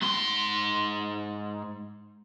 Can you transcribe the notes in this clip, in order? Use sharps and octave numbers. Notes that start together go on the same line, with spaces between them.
G#2 C6